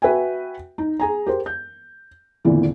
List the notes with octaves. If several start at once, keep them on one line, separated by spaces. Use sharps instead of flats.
F#4 B4 E5 G5 G#5
D#4
G#4 G#5 A#5
G4 A#4 C5
G6
G#1 E2 A#2 D3 E3